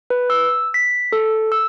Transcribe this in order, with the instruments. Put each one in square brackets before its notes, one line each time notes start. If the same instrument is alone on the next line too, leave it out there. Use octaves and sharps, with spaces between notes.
[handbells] B4
E6
B6
A4
E6